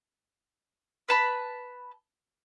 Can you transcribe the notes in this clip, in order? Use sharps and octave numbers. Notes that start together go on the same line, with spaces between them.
B4 A5 B5